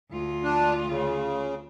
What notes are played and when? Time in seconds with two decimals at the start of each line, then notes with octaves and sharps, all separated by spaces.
0.11 D2 F4
0.44 D4
0.89 C#3